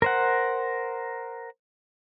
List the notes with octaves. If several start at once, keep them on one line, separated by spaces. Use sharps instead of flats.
A#4 C5 F#5